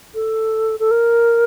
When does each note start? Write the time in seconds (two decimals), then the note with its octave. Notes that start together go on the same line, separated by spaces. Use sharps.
0.14 A4
0.80 A4
0.91 A#4